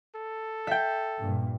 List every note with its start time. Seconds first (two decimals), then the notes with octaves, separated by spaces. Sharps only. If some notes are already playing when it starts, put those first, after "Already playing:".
0.15 A4
0.67 E5 G5
1.19 G2 A#2